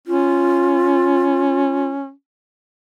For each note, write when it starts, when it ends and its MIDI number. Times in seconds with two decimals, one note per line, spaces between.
0.07 2.11 61
0.07 1.87 65